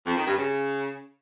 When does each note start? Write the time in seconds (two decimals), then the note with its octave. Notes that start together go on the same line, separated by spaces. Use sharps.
0.07 F2
0.17 D#3
0.27 G2
0.37 C#3